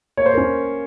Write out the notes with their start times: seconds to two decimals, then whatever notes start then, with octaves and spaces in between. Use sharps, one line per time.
0.17 A#3 C#5
0.26 C5
0.34 A#4
0.37 C#4